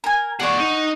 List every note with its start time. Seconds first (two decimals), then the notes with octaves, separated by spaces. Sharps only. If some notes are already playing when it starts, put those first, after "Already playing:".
0.04 A#4 G#5
0.40 G#4 D5 F#5 C#6
0.58 D#4